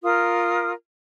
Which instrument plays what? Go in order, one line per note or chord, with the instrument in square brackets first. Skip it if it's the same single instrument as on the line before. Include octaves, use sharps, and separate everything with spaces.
[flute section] F4 A#4 D#6